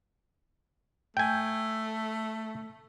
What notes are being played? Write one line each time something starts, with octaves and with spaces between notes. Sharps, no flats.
A3 G5 G#5